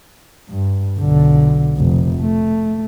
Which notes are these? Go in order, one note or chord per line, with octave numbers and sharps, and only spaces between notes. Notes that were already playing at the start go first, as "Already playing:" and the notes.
G2
B1 D3
F1
A3